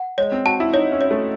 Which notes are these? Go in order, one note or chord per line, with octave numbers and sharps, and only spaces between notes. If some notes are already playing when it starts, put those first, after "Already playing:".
Already playing: F#5
G#3 C#5
C4
F#4 A5
E4
D#4 C#5
C#4
C#5
A3